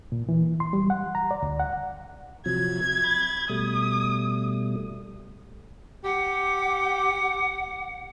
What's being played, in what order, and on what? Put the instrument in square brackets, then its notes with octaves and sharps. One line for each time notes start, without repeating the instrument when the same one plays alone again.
[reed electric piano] A#2
E3
C6
G3
F#5
A#5
D5
D2
F#5
[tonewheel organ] C3 F3 F#3 [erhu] G#6
[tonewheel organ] B5 A6
[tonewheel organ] B2 G3 A3 [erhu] D#6
[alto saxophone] G4 [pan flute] F#5 [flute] D6